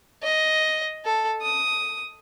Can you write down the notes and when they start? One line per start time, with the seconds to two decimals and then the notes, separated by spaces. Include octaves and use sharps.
0.23 D#5
1.05 A4
1.41 D#6